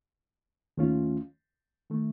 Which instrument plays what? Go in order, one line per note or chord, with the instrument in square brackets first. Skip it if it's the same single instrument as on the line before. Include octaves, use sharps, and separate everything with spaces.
[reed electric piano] D#2 D#3 A3 C#4 F4
D#3 A3